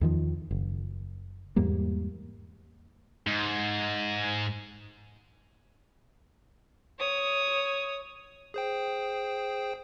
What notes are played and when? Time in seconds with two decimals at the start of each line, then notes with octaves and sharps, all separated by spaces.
0.01 E2 D#3 F3
0.51 F#1
1.56 E2 G#2 G3 A#3
3.27 G#2
6.99 C#5 D#6
8.54 G#4 C5 G5